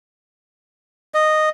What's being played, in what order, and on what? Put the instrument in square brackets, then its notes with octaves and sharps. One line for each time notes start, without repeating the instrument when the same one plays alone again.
[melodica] D#5